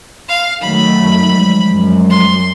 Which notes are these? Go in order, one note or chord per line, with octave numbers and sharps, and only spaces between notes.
F5
D#3 F#3 A3 B5
F#2
F3 G3 G#3
F#2
C6